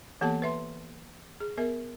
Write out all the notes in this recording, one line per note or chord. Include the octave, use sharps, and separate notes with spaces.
E3 A#3 B3 G4 A4 A5
B4 E5 C6
G#4
B3 G#4 A#4 E5